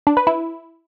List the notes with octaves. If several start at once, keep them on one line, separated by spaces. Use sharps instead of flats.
D4
B4
E4